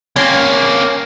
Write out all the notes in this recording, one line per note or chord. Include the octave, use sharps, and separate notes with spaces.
A#3 C4 C#4